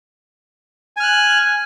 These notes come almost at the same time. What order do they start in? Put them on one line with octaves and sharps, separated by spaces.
G#5 F6 F#6